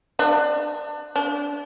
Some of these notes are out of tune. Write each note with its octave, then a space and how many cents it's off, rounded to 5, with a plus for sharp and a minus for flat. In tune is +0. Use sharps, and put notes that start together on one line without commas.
D4 +20
D4 -20